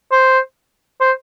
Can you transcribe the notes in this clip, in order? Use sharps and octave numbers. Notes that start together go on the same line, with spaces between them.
C5
C5